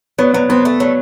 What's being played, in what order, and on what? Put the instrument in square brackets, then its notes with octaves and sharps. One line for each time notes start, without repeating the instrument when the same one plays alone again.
[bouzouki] F#3 [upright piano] B3
[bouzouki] F#3 [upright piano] B3
[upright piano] B3 [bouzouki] C4
[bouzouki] A3
F#3